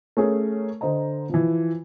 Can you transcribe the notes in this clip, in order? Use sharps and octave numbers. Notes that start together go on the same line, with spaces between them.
A3 C#4 G#4 A#4
D3 C5 D#5 A#5
E3 F3